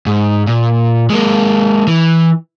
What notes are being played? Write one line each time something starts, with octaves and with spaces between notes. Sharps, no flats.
G#2
A#2
G#3 A#3
E3